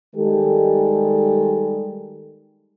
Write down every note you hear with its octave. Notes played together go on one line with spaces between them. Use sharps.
D#3 G3 G#3 G4 A4